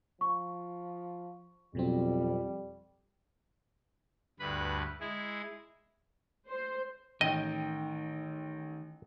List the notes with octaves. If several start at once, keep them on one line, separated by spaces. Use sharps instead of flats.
F3 C#6
F2 B2 F#3 G3 C4
D2 G2 B4 B5
G#3 E4 G#4
C5
A1 D#3 D#5 G5